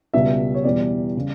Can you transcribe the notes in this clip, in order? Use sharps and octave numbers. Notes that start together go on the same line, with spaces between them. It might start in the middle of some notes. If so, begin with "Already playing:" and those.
C#2 B2 G3 E5
C#5
E2 B2 G3 D5
C#3 G3